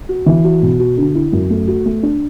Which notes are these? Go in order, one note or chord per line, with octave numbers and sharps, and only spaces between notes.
F#4
E3
F#4
B2
F#4
D3
E4
F#2
A3
F#4
A3
D4